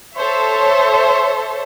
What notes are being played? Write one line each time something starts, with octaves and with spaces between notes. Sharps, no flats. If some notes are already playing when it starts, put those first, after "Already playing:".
A4 C5 C#5 E5